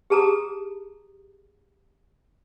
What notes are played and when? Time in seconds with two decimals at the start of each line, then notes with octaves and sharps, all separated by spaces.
0.10 G4 G#4 A5 A#5 D#6